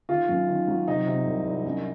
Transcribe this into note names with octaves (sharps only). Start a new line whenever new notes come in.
D#3 F4
F#2
D#3
F#3
C3 D#4
C3
C2
C2
F#2